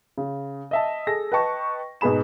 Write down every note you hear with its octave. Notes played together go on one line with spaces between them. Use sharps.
C#3
D#5 E5 A5
G#4 A4 A#6
B4 D#5 G5 A5 C#6
G#2 B2 B3 G#4 B5 E7